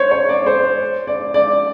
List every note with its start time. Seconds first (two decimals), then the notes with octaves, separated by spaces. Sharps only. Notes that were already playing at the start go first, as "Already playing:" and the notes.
Already playing: C5 C#5
0.11 C#5
0.29 D5
0.46 C5
1.07 D5
1.34 D5